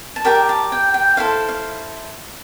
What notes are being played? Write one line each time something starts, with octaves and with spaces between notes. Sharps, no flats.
A5
G4 A#4 D5 G5
A5
G5
G5
E4 A4 C5 F5
F5